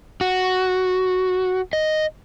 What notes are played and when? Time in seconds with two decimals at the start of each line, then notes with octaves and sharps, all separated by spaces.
0.21 F#4
1.73 D#5